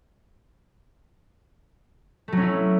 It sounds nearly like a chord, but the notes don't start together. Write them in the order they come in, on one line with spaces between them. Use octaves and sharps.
A3 F#3 C#4 E4